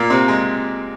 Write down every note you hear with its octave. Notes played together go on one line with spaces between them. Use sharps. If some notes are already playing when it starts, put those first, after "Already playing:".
Already playing: A#2 A#3
C3 C4
G#3